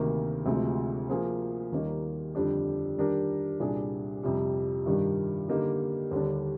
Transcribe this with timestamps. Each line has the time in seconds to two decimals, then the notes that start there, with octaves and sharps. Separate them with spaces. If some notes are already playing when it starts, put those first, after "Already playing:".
Already playing: D2 C3 D#3 A#3
0.46 D2 C3 F3 G#3 C4
1.09 F3 A#3 F4 G#4 C5
1.72 D#2 D#3 G3 A#3 D#4
2.35 F2 D3 G3 D4 G4
2.97 D#3 G3 D4 G4 A#4
3.60 C2 A#2 G3 D4 G#4
4.23 F2 C3 G3
4.86 G2 D#3 G3 D4 G4
5.48 D3 G3 A#3 D#4 G4
6.11 D#2 D3 G3 D4